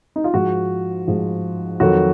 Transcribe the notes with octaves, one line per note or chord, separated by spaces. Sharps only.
D#4
F4
G#2 F3 F#4
G#2 F3
F2 D#3 F#3 F#4